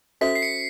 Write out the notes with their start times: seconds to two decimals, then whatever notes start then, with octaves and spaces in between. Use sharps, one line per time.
0.21 C#4 F#4 A4 C5 E5 B6
0.35 C7
0.42 C#7